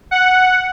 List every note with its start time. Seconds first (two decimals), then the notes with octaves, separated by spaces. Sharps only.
0.11 F#5